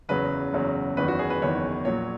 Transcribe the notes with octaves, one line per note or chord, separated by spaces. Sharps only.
F#1 E2 C#3 F#3 B4
F#1 E2 C#3 F#3
F#1 E2 D#3 B4
F#4
G#4
B4
F#1 E2 D#3 C#5
A#1 A#2 F#3 C#5